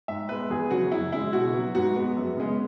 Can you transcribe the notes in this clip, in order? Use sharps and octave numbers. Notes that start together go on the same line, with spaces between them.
G#2 E5
G#3 B3 B4
E2 G#4
C#3 F#3 F#4
F#2 E4
C#3 G#3 E4
B2 F#4
F#3 B3
G#2 F#4
G#3 B3
F#2
C#3 G#3 B3